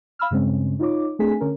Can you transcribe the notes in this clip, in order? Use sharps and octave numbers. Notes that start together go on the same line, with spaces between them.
F5 B5 E6 F6
G2 C#3 G#3 C4 C#4
D#4 F4 C#5 D6
A3 C4 D4 G#4 G#5 B6
D3 C#4 A#4